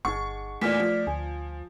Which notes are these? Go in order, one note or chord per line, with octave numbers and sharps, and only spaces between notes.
G1 D#4 G#4 F#5 C#6
E2 A#2 A3 D5 F6 B6
F3
D2 G#5